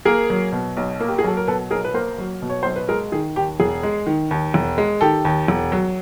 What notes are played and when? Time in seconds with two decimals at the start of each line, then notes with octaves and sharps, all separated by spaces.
0.05 A#3 G#4 A#4
0.30 F#3
0.52 B2
0.77 B1
1.00 A#3
1.08 G4
1.19 G#4
1.24 F#3 A4
1.37 A#4
1.47 B2 A4 B4
1.71 B1 G#4 A#4
1.84 B4
1.94 A#3 A#4 C5
2.18 F#3
2.42 B2
2.50 C#5
2.63 B1 C5
2.76 B4
2.89 G#3 G#4 A#4
3.12 D#3 G#4
3.36 D#2 G4
3.60 E1 G#4
3.83 G#3
4.07 D#3
4.31 D#2
4.54 E1
4.78 G#3
5.01 D#3 G4 A4
5.25 D#2
5.48 E1
5.72 F#3